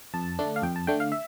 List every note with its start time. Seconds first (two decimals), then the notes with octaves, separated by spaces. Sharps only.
0.14 F2 A5
0.39 D3 A3 D4
0.56 F5
0.62 F2 G5
0.76 A5
0.87 D3 A3 D4 G5
1.00 F5
1.12 E5